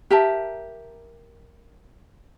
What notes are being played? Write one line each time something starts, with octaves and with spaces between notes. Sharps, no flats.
G4 A#4 E5 A5